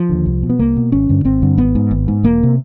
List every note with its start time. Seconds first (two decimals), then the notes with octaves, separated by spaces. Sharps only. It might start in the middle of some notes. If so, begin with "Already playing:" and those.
Already playing: F3
0.09 D#2 D3
0.26 C2
0.43 B2
0.49 B3
0.59 C2 A#3
0.76 B2
0.92 G#1 C#4
1.09 G2 D3
1.25 G#1 C4
1.42 G2 D3
1.57 G#1 B3
1.75 G#2
1.91 G#1
2.08 G#2
2.24 E1 A#3
2.43 C3